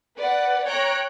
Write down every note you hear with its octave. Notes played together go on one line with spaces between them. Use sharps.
B4 D5 F#5
C#5 G5 A#5 F#6 D7